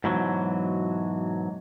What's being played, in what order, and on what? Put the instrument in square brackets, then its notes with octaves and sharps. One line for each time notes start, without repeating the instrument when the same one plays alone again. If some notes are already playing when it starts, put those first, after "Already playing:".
[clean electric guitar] G#2 B2 E3 F#3